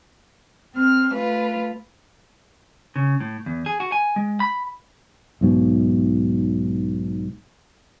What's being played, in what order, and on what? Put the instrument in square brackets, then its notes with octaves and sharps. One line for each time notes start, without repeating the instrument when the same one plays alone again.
[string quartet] C4 F6
A3 F4 B4
[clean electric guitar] C#3
A2
E2
G#4
F#4
G#5
G#3
B5
[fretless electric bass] B1 G#2 B2